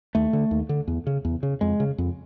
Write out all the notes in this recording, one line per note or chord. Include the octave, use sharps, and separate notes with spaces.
D#2 A3
D3
D#2
D3
E2
C#3
E2
C#3
F2 G#3
C#3
F2